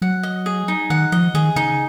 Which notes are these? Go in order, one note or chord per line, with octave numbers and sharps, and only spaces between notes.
F#3 F#5
D#5
G#4
D#4
D#3 F#5
F3 D#5
D#3 G#4
C#3 D#4